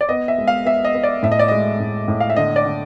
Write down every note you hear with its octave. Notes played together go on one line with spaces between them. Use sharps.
D5
B3 D#5
E5
G#3
F5
B3 E5
D#5
B3
D5
A2 E5
D#5
D5
G#3 D#5
A2
A2
F5
E5
D3 D#5
D5
D3